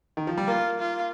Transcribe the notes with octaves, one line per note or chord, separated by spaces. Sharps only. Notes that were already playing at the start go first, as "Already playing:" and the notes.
D#3
F3
G3
A#3 F4
F4